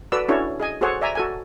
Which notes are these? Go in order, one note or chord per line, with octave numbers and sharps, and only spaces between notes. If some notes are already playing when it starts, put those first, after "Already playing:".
F#4 A4 B4 D5 E6
C#4 D4 E4 F#4 A4 C#5
G#4 D#5 G#5
F#4 G#4 A4 C5 C#5 F#5
D5 E5 G#5 A#5
F#4 A4 G#5